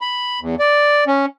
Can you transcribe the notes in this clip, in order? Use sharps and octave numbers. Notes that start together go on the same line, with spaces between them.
B5
E2
D5
C#4